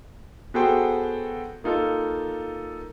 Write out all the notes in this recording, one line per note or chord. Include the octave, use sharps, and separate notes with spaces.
B3 F#4 G#4 A4 C5 G5
A#3 D#4 F4 A4